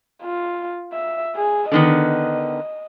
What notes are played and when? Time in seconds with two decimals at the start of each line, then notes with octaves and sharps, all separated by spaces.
0.23 F4
0.93 E5
1.36 G#4
1.72 D3 D#3 B3 D#5